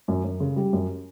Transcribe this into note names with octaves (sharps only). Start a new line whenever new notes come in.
F#2
F#2
C#3
G3
F#2